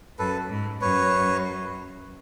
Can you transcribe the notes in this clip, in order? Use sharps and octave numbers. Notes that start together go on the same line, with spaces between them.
F#2 A4 B4
G#2
F#2 B4 C#5